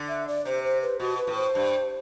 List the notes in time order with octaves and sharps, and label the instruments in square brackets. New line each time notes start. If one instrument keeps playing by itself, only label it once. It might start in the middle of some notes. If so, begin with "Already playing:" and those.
Already playing: [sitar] D3
[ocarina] E5
D5
[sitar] C3 [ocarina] C5
[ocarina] C5
B4
[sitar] B2 [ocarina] F#4
[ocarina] B4
[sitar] A2
[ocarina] C5
[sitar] G2